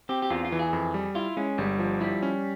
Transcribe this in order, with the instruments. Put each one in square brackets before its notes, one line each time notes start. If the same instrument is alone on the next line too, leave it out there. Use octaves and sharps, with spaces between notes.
[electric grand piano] C4 [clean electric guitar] G4
[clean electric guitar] G4
[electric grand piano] E2 [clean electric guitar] F4
[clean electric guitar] F4
[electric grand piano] E3
[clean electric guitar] G#4
[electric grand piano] F2
G3
[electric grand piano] E4 [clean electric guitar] F4
[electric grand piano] G#3 [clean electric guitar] C#4
[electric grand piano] G1 [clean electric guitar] G3
[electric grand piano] F3
[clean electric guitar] G3 [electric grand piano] E4
[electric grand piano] C#4